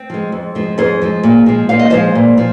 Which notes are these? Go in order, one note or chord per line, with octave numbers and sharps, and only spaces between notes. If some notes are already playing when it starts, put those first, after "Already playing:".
Already playing: C4
F3 G#3
F2
F3 G#3
F2 G#4 C5
F3 G#3
A#2
F3 G#3
A#2 F5
D#5
F3 G#3 C5 F5
A#2
F3